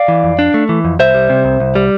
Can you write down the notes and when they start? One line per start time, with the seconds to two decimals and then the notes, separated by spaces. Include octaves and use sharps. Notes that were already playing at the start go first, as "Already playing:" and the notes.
Already playing: D5 F5
0.08 E3
0.24 F2
0.39 D4
0.54 A3
0.69 E3
0.85 F2
0.99 C2 C5 E5
1.14 G3
1.30 C3
1.45 C2
1.60 C2
1.75 G3